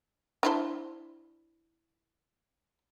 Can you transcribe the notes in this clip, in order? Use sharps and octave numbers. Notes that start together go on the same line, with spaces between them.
D4 E4 C5